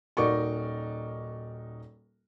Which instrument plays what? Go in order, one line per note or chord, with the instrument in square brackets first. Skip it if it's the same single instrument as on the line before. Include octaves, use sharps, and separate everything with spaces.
[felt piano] D#1 D#4 F#4 A#4 D5 C#6